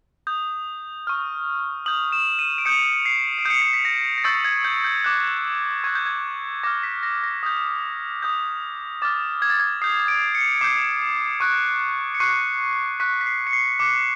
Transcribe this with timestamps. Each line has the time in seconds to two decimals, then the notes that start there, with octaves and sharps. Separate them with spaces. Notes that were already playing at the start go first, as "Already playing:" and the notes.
0.27 D#6 G6
1.07 C#6 F6
1.86 D#6 G6 F#7
2.12 E7
2.39 D#7
2.58 D7
2.65 D#6 G6 C#7
3.05 C7
3.38 D7
3.45 D#6 G6 C#7
3.62 C7
3.73 B6
3.85 A#6
4.18 A#6
4.24 C#6 E6 G6 A6
4.45 G#6
4.65 G6
4.84 G6
5.04 D6 F#6
5.84 C#6 F#6 G#6
5.95 G6
6.06 G#6
6.63 D6 F6 A#6
6.83 B6
7.03 A#6
7.23 A#6
7.43 D#6 G6
8.22 D#6 G6
9.02 D6 F6 A6
9.42 G#6
9.50 A6
9.59 G#6
9.82 D#6 G6 C7
10.08 D7
10.35 C#7
10.61 D6 G6 C7
11.40 C#6 F#6
12.15 C#7
12.20 C#6 F#6 C7
13.00 C#6 F#6 B6
13.21 B6
13.26 C7
13.47 C#7
13.53 C7
13.79 D6 F#6 C#7